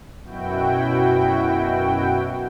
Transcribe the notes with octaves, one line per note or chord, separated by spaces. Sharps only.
F#2 B2 E4 F#4 G5